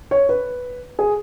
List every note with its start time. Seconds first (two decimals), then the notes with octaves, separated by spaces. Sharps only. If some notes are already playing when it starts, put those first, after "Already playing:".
0.11 C#5
0.29 B4
0.99 G#4